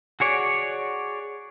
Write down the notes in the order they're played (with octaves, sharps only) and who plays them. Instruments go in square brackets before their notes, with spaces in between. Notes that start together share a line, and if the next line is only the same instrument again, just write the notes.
[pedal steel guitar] F#4 G#4 C#5 D5